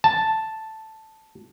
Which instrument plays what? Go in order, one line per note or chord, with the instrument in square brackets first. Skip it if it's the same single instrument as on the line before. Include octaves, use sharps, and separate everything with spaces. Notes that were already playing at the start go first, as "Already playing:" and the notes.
[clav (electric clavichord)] A5